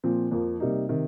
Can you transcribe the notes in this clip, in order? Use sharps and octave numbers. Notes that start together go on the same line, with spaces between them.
A#2 F3 C4
F2 F3 A#3
C3 G3 A#3 D#4
C3 D#3